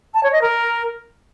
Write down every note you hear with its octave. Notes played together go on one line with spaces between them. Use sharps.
A5
C#5
D#5
A#4